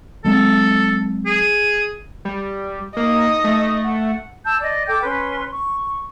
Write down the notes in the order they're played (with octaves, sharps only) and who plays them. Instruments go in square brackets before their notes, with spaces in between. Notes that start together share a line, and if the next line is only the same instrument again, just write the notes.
[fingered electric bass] F#3 G#3 C4 [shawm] A4
[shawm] G#4
[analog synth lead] G3
[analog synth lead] A#3 [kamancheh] D#4 D#5
[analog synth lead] A3
[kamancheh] F#5
[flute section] A5 E6 G6
D5 D#5
A4 G5 D6 G6
C#4 B4 C6
C#6